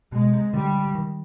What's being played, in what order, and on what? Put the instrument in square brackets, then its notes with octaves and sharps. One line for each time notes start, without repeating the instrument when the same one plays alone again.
[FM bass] B2 [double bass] G#3
[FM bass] C3
[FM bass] D3 [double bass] G3
[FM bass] D#3